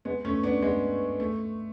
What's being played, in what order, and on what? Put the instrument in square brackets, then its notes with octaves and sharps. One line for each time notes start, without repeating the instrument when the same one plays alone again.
[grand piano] G#3 B3
A3 C#4
B3 D4
G#3 B3
A3